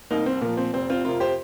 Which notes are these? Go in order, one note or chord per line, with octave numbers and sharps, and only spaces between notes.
C2 A#3 D#4
C4
A#2 F3 A#3
C4
F1 C4
C4 F4
F2 C3 F4 A#4
G4 C5